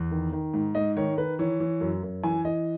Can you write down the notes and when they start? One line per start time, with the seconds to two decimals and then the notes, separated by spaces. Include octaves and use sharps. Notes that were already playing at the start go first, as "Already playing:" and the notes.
Already playing: E2
0.11 D#3
0.32 D#3
0.54 G#2
0.75 G#2 D#5
0.97 D#3 C#5
1.17 D#3 B4
1.39 E3 C#5
1.60 E3
1.81 F#2
2.03 F#2
2.23 E3 G#5
2.45 E3 D#5